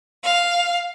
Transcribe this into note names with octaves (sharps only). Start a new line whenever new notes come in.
F5